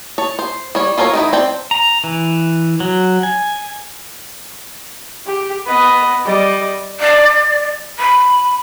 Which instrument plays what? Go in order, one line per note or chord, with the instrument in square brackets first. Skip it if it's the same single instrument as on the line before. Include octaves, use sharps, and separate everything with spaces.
[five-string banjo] C#5 A5
C5
G3 C#5
F4 A4 A#4 C5 C#5
D#3 D#4 E4
C4 D5 G5 A5
[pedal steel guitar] A#5
E3
F#3
G#5
[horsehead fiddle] G4
[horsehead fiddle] B3 [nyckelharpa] B4 D#5
[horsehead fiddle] G3 D#5 [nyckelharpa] D5
[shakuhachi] D5
B5